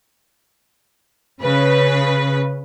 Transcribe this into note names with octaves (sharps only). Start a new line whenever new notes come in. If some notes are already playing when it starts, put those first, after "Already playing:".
C#3 B4